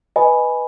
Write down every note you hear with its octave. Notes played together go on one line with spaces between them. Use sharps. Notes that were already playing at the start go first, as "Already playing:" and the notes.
B4 D#5 G#5 B5